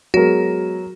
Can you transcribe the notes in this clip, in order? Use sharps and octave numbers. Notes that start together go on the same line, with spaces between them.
F#3 G#3 B3 F#4 G#4 A#4